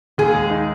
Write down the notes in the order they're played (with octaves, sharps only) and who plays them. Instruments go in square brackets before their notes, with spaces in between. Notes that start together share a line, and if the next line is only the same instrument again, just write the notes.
[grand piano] D#2 [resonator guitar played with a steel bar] G#4
[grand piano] G#3
D#4